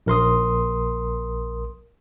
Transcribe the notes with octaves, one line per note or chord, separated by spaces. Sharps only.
A#1 A#4 C6 D#6